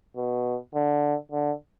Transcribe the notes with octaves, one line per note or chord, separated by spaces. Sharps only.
B2
D3
D3